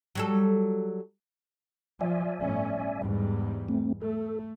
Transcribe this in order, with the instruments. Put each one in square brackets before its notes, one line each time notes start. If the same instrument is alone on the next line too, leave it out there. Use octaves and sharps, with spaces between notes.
[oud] F#3 G3 A4
[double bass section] F3 [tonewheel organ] D5 E5 G#5
[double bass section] G1 A2 C#4
E2 G#2 G3
[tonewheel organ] A3 C4
[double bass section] A3 [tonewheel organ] A4